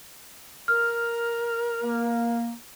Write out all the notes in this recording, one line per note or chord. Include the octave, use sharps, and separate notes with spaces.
A#4 F6
A#3